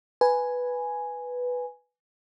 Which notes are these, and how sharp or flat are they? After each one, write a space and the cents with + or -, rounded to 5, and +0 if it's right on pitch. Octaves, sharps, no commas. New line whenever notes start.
B4 +0 G#5 +0